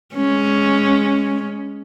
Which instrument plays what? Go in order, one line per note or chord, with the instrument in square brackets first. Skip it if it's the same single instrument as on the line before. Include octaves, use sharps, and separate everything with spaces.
[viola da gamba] G#3 C#4